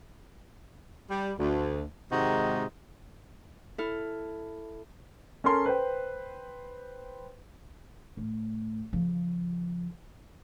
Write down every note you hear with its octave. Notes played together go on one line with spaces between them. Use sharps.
G3
D2
G#2 C3 D#3 G#3 D#4 F#4
E4 A4 F6
C#4 A4 A#4 C6
B4 C5 G5
A2
C#3 F3